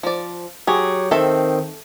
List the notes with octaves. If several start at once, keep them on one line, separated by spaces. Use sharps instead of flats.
F3 D5
F#3 G4 G#4 C#5
D#3 C4 A4 E5